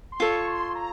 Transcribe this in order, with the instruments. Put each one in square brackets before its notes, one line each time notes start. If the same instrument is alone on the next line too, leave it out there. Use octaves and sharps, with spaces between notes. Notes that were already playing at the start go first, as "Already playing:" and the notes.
[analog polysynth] C6
[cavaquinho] F4 A4 C#5 [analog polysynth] C#6
[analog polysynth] C6
A#5